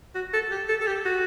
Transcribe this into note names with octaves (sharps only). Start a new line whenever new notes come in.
F#4
A4
G4
A4
A4
G4
F#4